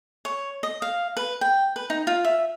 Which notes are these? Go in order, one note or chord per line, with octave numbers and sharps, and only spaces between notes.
C#5
D#5
F5
B4
G5
B4
D#4
F4
E5